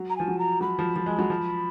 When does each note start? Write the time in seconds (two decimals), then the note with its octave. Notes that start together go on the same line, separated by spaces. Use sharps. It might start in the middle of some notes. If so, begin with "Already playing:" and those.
Already playing: F#3
0.09 A#5
0.16 F3 G#5
0.28 F#3
0.38 A#5
0.61 F#3 B5
0.79 F3
0.96 F3
1.06 G#3
1.19 F#3
1.30 F3